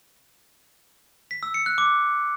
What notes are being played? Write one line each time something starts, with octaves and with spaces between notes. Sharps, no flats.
B6
E6
C#7
F#6
D6